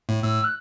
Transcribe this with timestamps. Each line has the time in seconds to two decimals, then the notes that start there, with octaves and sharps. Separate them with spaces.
0.09 A2
0.23 A2 E6
0.44 F#6